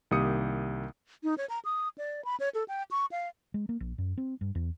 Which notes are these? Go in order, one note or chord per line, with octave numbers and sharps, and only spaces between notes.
C2 D#3 A#3 G4 D#6 C#7
D#4
C#5
A#5
D#6
D5
B5
C#5
A4
G5
C#6
F5
G#3
A#3
A#1
F#2
C4
G2
E2